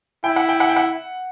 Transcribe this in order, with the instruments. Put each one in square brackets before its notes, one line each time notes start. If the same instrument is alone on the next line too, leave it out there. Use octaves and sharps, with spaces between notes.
[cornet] E4 [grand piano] G5
[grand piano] F#5
G5
F#5
G5
F#5